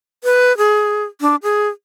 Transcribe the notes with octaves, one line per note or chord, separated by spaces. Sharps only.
B4
G#4
D4
G#4